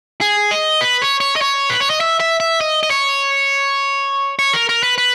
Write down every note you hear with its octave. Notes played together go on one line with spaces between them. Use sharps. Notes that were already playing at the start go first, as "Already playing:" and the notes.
G#4
D#5
B4
C#5
C#5
D#5
C#5
B4
C#5
D#5
E5
E5
E5
D#5
D#5
C#5
C#5
A#4
A#4
B4
B4